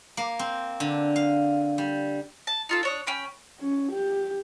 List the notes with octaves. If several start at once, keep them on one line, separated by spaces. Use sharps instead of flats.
A#3
C4
D3
F5
G3
A5
D#4 F4 A4
D4 C#5 D#6
C#4 G5 B5
C#4
G4